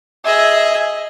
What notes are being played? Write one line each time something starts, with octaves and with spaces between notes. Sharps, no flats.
G#4 D#5 E5